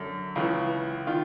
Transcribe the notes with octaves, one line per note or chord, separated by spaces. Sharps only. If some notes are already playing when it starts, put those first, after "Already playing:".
Already playing: F#2 D3
C#2 C#3 E3
D#3 F4